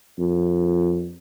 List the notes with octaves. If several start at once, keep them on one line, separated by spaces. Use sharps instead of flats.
F2